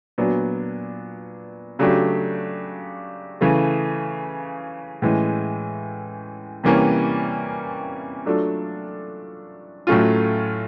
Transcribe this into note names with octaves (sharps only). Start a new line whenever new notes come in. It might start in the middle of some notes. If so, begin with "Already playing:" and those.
A#2 F#3 B3 D4
C#3 F#3 A3 D4 G4
C#3 E3 A3
A2 E3 G#3 C#4
C3 E3 G3 A#3 C#4
F#3 A3 D4 F4 A4
A2 F#3 A3 C#4 F4